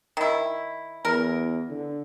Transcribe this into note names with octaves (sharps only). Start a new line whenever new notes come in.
D#3 E4
E2 A#4
D3